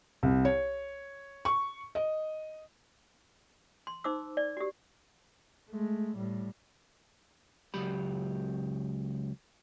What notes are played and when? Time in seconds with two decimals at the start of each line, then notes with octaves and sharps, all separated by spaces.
0.23 C2
0.45 C#5
1.45 C#6
1.95 D#5
3.87 C6
4.04 D#4 C5 D6 E6
4.37 D5
4.57 F#4 G4
5.70 G#3 A3
6.17 A2 G3
7.74 C#2 F#3 G4 B5